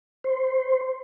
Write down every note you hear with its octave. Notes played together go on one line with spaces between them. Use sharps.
C5